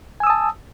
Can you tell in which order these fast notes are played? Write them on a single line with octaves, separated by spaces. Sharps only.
G#5 E6 D#6 A5